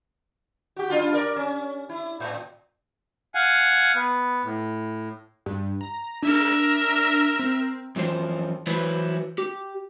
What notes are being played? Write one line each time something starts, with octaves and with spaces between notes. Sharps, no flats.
F#4 G4
G2 D4 F4
A#4 D5
C#4
E4
A2
F5 F#5 G#5
B3
A2
G2
A#5
D4 A#4 E5
C4
F#2 E3 F3 C5
E3 F#3 E4 B4 C5
G4